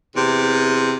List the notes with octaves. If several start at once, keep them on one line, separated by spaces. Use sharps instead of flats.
E2 C3